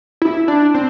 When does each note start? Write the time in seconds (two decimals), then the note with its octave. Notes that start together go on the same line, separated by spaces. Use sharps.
0.22 E4
0.48 D4
0.74 C4